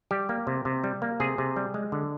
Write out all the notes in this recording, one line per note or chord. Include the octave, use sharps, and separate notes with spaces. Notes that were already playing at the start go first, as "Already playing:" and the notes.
G3 G4
A#3
C3
C3
G3
A#3
C3 G#4
C3
G3
G#3
D3